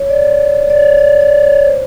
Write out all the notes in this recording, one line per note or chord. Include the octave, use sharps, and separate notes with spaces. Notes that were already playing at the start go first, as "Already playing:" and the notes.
Already playing: C#5
D5
D5
C#5
D5
D5
C#5
C5